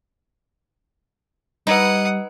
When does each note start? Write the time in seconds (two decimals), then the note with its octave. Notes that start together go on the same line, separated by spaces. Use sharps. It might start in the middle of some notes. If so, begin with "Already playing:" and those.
1.67 G3 D#4 B4 D#5 F#5 B5 D#6